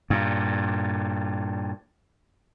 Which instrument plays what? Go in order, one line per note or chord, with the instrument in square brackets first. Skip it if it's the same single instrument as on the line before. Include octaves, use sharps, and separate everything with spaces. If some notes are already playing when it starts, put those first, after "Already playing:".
[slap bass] G2 A#2